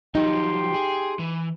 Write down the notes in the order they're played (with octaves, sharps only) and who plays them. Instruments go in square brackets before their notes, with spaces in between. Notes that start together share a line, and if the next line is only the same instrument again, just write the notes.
[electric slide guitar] F3 F#3 [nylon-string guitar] D#4 [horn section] G4 G5 C6
[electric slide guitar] G#4
E3